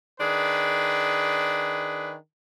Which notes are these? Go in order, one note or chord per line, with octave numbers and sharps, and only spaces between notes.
D#3 D4 G#4 B4